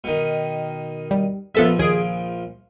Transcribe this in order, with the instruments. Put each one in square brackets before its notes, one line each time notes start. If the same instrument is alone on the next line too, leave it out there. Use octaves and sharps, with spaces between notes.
[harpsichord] B2 D#3
[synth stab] G3
[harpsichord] A#1 F3 [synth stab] B3 A4 E5
[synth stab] D#2 G#4 D7